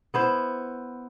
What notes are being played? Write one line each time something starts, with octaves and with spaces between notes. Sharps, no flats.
B3 E4 C5